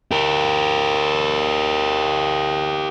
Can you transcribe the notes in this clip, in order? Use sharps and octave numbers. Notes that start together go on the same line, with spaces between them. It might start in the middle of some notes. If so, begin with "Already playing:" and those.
G4 A#4